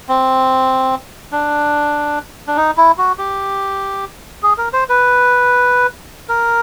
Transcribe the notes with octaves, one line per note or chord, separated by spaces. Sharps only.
C4
D4
D4
D#4
E4
F#4
G4
G#4
A#4
C5
B4
A#4